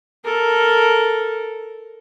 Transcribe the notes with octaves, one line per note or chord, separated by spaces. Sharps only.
A4 A#4